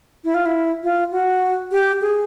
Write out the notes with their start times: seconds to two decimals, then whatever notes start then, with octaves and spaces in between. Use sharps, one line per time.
0.24 E4
0.34 F4
0.46 E4
0.83 F4
1.12 F#4
1.71 G4
2.01 G#4